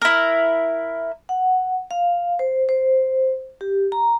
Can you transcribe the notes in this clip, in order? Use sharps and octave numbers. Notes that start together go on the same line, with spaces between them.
E4 A#4
F#5
F5
C5
C5
G4
A#5